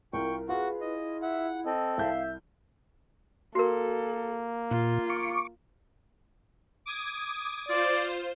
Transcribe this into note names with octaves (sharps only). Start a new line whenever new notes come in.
C2 F4 A#4 G5 C#6
F4 F#4 G#4 B4 F#5
E4 D#5
E5 F#5
C4 A4 D#5
C2 E5 F5 G6
A#3 F#4 A4 A#4
A#2 F4
C#6 D6
D6 D#6 G#6
F4 C5 D5